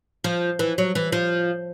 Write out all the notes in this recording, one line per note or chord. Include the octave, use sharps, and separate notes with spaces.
F3
E3
F#3
E3
F3